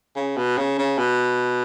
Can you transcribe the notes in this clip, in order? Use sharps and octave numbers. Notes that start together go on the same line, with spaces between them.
C#3
B2
C#3
C#3
B2